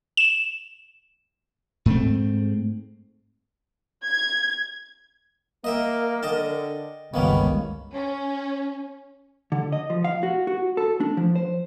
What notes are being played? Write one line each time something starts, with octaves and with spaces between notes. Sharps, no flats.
E7
G#2 A3 C4
G#6
A#3 A#4 D#5 E5 G5
D3 D#5 G5 A5
G1 C#2 D#3 A#3 B3 C#4 B5
C#4
D3
D#5
F3
F5
F#4
F#4
A4
D4
F3
C5